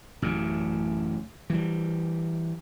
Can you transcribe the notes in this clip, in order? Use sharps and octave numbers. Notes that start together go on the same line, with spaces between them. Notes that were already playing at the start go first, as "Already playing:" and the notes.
A1 F#2 C#3
E3 G3